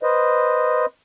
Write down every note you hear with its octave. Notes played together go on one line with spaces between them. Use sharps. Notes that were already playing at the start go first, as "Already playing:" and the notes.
B4 C5 D#5